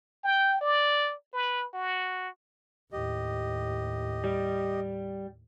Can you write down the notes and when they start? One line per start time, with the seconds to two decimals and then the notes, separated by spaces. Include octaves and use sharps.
0.24 G5
0.61 D5
1.33 B4
1.74 F#4
2.93 D#2 A2 G4 D#5
4.24 G3